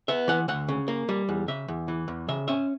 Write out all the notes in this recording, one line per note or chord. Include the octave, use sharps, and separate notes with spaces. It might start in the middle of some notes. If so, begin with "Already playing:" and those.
B3 E5
E3 F#5
D2 F#5
C#3
A#3
G3
E2
C#3 E5
E2
E3
E2
C#3 E5
C#4 E5